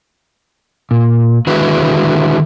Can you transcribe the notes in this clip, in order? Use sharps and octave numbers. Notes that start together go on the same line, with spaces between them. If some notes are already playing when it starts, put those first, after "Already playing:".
A#2
D3 D#3 G#3 E4 F#4 B4